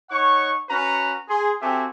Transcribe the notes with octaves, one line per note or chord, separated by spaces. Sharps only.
D#4 C#5 F#5 C#6
C#4 F#4 B4 A#5
G#4 C6
C4 F#4 G4 A4 E5 G#5